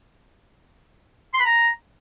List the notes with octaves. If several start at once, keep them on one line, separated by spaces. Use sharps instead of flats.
C6
B5
A#5